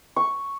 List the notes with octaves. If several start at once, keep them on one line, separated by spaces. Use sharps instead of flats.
C#6